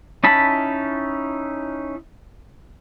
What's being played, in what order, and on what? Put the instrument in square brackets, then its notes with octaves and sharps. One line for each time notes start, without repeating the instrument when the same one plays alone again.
[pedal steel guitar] C#4 D#4 E4 A5 B5